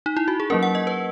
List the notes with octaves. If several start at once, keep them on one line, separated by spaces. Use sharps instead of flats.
D#4
E4
F#4
G#4
F#3 A#3 C#4 A#4
F#5
D#5
B4